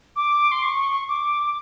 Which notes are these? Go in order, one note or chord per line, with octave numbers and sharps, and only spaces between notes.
D6
C6
C#6
D6